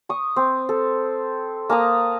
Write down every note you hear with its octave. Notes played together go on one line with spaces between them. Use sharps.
C#6 D#6
C4
A4
A#3 A5 A#5 D#6